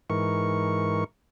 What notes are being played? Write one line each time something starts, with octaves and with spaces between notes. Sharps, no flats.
G#2 E3 A#4 C#6